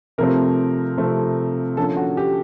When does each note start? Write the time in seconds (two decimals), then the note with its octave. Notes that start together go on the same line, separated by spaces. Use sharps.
0.18 C3 F3 A3 C4 A#4
0.97 C3 F3 A3 C4
1.77 D3 F3 A#3 C#4 A4
1.97 F#4
2.17 G4